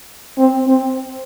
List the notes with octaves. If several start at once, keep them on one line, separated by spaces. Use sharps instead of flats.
C4
C4